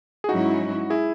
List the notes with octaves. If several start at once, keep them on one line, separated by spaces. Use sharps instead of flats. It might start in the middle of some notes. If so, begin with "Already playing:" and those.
G#4
G#2 F#3 C#4 D#4 E4 F#4
E4 G#4